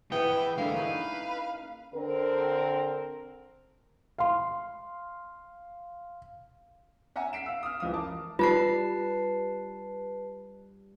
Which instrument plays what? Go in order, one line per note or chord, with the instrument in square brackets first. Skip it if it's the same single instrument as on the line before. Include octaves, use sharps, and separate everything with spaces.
[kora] E3 G#4 F#5 [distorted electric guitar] B3 [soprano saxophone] G5
[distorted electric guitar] B4 E5
[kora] D3 A#3 [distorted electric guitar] G#3 E5 [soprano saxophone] F5
[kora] C#4 D#4 E4 [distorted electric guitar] B4
[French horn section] D3 C4 A#4
[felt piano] F5 C6
[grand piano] E5 F#5 G#5 A#5
B6 C7 D7 E7
F5 E6
D#6 F6
C#2 E3 F3 F5 D#6
A#4 A5 D6
[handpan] G3 [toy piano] F4 [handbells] B4 A5 C7